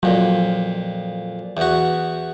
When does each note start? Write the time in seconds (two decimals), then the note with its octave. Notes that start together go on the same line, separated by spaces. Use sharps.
0.03 F2 A#2 F#3
1.57 E2 F#4